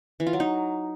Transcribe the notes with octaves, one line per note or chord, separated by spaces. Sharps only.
E3
F4
F#3
D#4